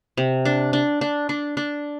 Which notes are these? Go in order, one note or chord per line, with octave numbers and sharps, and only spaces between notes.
C3
D4
D4
D4
D4
D4